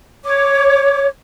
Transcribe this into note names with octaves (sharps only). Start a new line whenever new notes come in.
C#5 D6